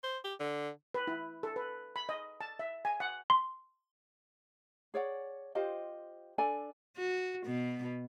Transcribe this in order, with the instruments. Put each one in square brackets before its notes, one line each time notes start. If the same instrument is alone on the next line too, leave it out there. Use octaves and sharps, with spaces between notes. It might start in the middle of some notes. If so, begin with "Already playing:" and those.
[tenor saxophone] C5
G4
D3
[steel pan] B4
E4
A4
B4
B5
D#5
A5
E5
G#5
F#5
[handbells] C6
[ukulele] G#4 C#5 D5 F#5
F4 G4 C5 D#5
D4 A4 D5 G#5
[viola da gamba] F#4
B2 B3